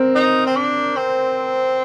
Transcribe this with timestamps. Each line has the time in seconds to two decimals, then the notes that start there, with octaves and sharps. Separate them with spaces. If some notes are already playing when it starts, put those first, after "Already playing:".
Already playing: C4 A#4
0.15 D#4
0.46 C4
0.56 D4
0.96 C4